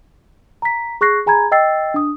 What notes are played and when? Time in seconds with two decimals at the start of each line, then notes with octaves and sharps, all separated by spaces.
0.62 A#5 B6
1.01 G#4 C#6 F#6 A#6 C7
1.26 G#4 G#5 A#5 B5 G#6
1.52 D#5 G5 E6 A6 C7
1.94 D4 D#6